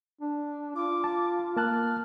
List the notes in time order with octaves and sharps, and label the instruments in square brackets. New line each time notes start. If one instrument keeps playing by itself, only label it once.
[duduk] D4
[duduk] F4 [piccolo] D6
[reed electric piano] A5
[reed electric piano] A#3 A5 F#6 [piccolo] F6